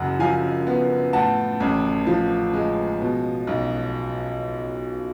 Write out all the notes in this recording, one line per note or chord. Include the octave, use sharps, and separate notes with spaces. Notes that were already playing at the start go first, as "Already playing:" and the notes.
Already playing: F#1 F#2 F#5
F3 F5 G#5
B3
A2 F#5 A5
A1
F3
G#3
B2
B1